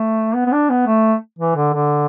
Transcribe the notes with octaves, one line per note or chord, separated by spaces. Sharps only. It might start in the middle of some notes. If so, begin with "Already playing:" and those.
Already playing: A3
B3
B3
D4
B3
A3
E3
D3
D3